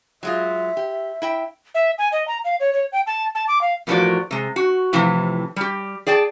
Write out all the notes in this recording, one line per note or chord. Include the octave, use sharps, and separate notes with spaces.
F#3 G#3 F4 E5
G4
E4 E5 G5
E5
G#5
D#5
A#5
F5
C#5
C#5
G5
A5
A5
D6
F5
E2 A2 F3 A#3 F#4 D5
C3 G#3
F#4
A2 C3 E3 F3
G3 G4
G#4 D5 G5 A5